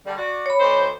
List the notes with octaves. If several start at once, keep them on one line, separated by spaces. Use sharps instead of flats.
D3 G3
F#4 D5
C#5 B5
D2 D#4 C5